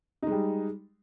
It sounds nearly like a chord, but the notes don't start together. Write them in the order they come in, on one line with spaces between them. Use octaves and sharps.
D#4 G#3 G3